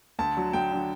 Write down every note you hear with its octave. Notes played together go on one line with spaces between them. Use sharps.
D2 A5
D3 F#3
D2 G5
D3 F#3